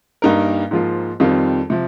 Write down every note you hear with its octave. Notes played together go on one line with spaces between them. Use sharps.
G2 G3 A#3 D#4 A#4
G#2 F3 A#3 F4
F2 D#3 G3 C4 F4
C3 F3